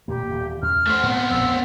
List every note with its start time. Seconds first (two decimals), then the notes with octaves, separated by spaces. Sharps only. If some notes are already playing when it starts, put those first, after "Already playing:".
0.08 E1 A#2 A#3 G4
0.28 D#1 E2
0.62 E2 C#4 F6
0.87 A3 C5
1.03 A2 B3 C4
1.30 A#1 F2 E6